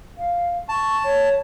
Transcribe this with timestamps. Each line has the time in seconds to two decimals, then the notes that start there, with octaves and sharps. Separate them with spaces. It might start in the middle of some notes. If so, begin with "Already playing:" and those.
0.18 F5
0.69 A5 C#6
1.04 C#5